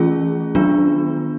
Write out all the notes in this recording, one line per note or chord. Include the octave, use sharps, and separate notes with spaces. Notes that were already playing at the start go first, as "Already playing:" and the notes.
Already playing: E3 A3 C#4 F4 G#4
D#3 F#3 B3 D4 F4